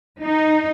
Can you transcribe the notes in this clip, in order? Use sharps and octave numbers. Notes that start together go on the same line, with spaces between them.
D#4